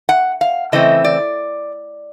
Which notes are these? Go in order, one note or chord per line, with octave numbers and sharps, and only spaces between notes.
F#5
F5
C#3 E3 A3 C4 D#5
D5